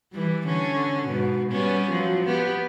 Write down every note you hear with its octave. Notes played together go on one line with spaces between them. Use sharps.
E3 G3
D3 C#4
G#2 B2
G3 B3 C#4
F3 F#3
B3 G4